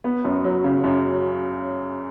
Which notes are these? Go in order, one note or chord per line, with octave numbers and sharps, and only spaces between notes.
B3
F#2
F#3
C#3
F#2